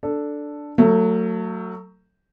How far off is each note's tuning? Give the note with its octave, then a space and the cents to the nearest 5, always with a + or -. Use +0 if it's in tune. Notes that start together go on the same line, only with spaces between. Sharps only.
D4 +0 A4 +0
F#3 +0 A3 +30